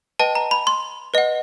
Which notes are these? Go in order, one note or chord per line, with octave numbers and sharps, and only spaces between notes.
B4 D#5 G5 A5
A#5
B5
C6
B4 D#5 F#5